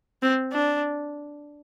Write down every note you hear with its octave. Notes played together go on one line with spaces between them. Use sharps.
C4
D4